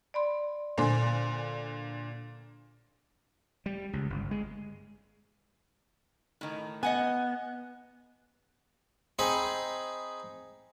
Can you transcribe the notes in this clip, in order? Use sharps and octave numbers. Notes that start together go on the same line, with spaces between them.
D5 B5 C6
A#2 D3 C5 G#5 C6
G3
C#2
G1
G#3
A2 D#3
B3 D#5 F#5 G#5
C4 D#4 G#4 B5